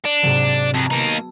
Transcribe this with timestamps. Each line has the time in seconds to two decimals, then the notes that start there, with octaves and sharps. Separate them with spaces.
0.05 D4 D7
0.23 G#2 C3 F#3
0.74 F2 A5 A#5 E6
0.91 A#3 B3 D#4